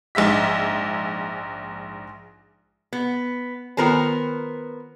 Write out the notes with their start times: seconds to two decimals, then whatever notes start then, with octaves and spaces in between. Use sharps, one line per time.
0.15 A#1 G#2 E5 B6
2.93 B3
3.77 D#3 B3 F4 A#4 C5 G5